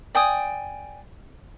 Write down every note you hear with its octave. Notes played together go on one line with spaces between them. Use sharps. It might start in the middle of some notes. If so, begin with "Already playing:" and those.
D5 G5 G#5 D#6